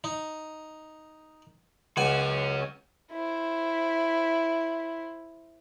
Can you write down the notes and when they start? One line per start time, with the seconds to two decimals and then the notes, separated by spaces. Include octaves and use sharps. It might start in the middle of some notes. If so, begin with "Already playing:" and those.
0.04 D#4
1.97 C#2 C#4 F#4 F#5 G#5
3.12 E4 C5